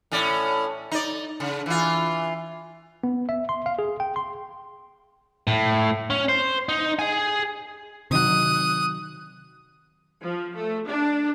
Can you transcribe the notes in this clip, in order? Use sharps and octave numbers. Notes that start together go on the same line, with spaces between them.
A2 C#4 D5
D#4 D5
C#3
E3 F4
B3
E5
C6
F5
G#4
G5
C6
A2
C#4
C5
D#4
G#4 G#5
C3 D#3 F#3 D#6 F#6
F3
A3
D4